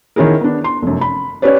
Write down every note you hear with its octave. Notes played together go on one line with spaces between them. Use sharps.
D#3 C#4 E4 G#4 A#4
B3 D4
C6
F1 F#2
B5
C#4 G4 B4 C#5 D5